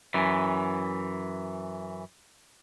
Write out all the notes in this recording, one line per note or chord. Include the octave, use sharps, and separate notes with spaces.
F#2 E3